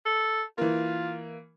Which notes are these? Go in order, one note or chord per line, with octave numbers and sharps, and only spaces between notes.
A4
E3 A#3 F4